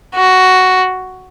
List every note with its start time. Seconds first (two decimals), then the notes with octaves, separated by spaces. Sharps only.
0.15 F#4